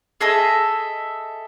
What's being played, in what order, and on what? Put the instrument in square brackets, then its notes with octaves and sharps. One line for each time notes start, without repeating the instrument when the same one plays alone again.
[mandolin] G#4 A4 D#5 E5